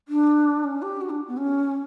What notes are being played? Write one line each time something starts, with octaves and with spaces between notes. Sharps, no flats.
D4
C#4
G4
F#4
D4
B3
C#4